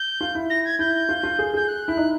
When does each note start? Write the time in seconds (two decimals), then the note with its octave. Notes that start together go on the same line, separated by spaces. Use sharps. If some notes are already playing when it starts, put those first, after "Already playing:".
Already playing: G6
0.21 F4
0.35 E4
0.50 A#6
0.65 G#6
0.79 E4 G6
1.09 F4
1.23 F4
1.39 G#4
1.54 G#4 G6
1.68 F#6
1.88 E4
1.97 D#4